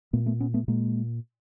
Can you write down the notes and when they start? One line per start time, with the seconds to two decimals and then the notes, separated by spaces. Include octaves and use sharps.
0.13 A#2 A3 B3
0.26 A3 B3
0.40 B3 C#4
0.54 A3 B3
0.68 A#2 G#3 A#3